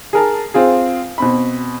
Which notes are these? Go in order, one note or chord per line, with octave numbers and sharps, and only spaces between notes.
G#4 A#4 A5
C4 F4 G#4
B2 C4 B5